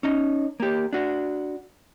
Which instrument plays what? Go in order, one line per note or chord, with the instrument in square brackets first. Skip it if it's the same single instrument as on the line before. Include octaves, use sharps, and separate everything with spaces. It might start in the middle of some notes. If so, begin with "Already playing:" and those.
[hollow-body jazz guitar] C#4 D#4 D#5
A#3 G4
D4 F#4